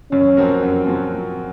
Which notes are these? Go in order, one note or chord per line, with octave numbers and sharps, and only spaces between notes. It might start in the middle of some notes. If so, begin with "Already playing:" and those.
F#2 C#4
F3 C4 F#4 A#4
F#2
F3 C4 F#4 A#4